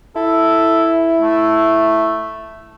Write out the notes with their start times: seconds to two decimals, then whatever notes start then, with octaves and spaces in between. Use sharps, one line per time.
0.16 E4 A4
1.22 A3